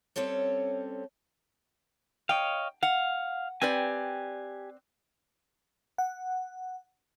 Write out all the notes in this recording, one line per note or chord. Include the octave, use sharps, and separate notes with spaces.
G3 C4 C#4 A4 C#5
C#5 D#5 F5 G5
F5 F#5
C4 G4 B4 D5 G#5
F#5